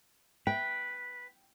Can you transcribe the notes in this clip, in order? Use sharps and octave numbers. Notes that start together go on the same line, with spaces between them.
B4 G5